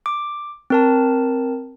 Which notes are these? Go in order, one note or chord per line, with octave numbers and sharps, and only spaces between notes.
D6
C4 A#4 A5